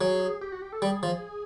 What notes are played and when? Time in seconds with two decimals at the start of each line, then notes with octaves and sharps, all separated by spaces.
0.01 F#3 G#4
0.41 G4
0.52 F#4
0.62 G4
0.72 A4
0.82 G3 G#4
1.03 F3